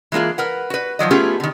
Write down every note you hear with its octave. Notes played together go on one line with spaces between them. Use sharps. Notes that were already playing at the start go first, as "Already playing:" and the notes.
E3 G#3 A#3 F4 G#4
A#4 B4 F#5
F#4 B4
D#3 F3 F#3 D#5
A3 B3 C#4 F4 G4 G#4
D3 D#3